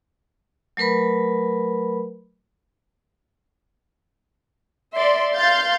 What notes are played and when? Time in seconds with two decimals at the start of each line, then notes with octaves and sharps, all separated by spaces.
0.77 F#3 A3 A#4 B4 B5
4.95 D5 E5 C6
5.34 F5 C6 G6 A6